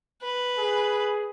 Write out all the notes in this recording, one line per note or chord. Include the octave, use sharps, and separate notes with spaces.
B4
G#4